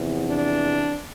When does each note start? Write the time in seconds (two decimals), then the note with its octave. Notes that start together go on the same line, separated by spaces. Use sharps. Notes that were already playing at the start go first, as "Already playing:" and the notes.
Already playing: E2 C3 F3
0.25 D4